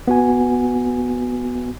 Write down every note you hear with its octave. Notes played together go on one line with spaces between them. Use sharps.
B3 F#4 G#5